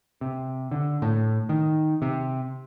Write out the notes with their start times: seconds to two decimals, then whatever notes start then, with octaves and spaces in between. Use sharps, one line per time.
0.21 C3
0.72 D3
1.02 A2
1.49 D#3
2.02 C3